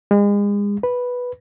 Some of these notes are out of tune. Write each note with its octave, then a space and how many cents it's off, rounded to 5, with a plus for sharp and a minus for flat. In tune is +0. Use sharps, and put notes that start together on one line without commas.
G#3 -35
B4 -5